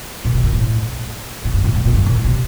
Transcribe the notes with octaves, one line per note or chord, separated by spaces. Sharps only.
A#2
C3
A#2
A2
A2
G2
A2
A2
A#2
G2
A#2
A2
C3